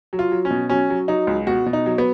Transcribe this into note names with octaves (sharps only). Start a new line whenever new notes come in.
F#3
F4
F#3
C#4
B2
F#3 C#4
F#3
F#3 D#4
C#2
B2 F#4
B2
D#4
F#3
B3